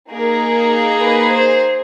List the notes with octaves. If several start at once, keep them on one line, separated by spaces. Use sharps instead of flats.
A#3 D#4 G#4 A#4
B4
C5